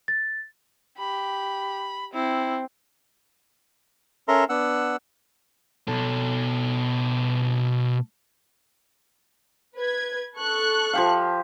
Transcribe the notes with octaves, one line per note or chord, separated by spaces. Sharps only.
A6
G4 B5
C4 E4
C#4 A4 A#4 E5 A#5 C6
B3 D4 F#5 E6
B2 A4
B4 G#6
A4 C#6 F#6
F3 G4 F5